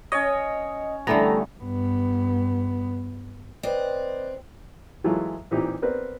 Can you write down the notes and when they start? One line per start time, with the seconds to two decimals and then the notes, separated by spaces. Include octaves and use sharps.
0.12 C#4 C#5 D#5
1.07 D3 E3 G3 A3 B3 A#5
1.59 G2 B3
3.63 C4 B4 D5 D#5
5.04 E3 F#3 G#3 A3 F4
5.51 A#2 E3 C4 D#4 G4
5.82 B3 C4 A#4 B4 D5